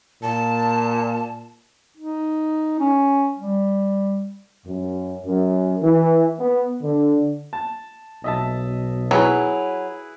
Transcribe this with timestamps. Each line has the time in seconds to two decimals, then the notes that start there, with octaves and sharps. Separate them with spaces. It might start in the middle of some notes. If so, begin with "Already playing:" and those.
0.22 A#2 A5
1.97 D#4
2.80 C#4
3.39 G3
4.66 F#2
5.26 F#2
5.81 E3
6.39 B3
6.83 D3
7.53 A5
8.24 B1 D#5 E5 A5
9.11 F#3 E4 G#4 B4